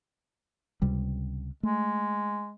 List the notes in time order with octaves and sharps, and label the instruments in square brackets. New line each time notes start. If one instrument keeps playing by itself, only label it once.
[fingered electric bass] C#2 C3 G3
[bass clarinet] G#3 [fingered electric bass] A3